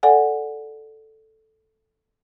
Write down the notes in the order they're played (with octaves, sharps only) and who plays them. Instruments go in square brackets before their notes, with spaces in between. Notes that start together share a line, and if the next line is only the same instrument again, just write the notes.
[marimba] A4 D5 F#5 G#5